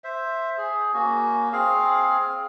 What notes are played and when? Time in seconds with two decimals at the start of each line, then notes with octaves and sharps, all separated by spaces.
0.04 C5 E5
0.58 G#4
0.94 A#3 C#4 F#4
1.53 C4 G#4 F5